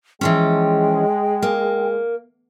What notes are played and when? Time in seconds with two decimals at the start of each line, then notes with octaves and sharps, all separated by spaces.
0.21 E3 F3 G#3 C#4 G5
1.42 A#3